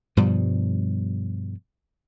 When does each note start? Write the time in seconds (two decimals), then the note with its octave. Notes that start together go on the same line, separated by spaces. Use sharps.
0.17 G2 B2 F3 G3